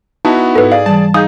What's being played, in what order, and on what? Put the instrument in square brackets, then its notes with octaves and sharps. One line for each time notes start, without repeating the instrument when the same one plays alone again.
[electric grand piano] B3 E4 F#4 [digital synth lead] D#4 [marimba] A5
[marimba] G#2 [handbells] A4 B4
[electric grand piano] G#4 D5 [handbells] F5
[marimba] E3 G3 [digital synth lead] A5
[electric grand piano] D#4 [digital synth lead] G#4 [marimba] F5 G6 [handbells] D#6